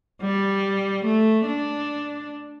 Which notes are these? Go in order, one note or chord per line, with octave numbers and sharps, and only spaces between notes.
G3
A3
D4